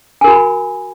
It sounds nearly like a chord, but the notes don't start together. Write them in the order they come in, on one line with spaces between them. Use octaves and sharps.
G#5 A#4 F#4 B5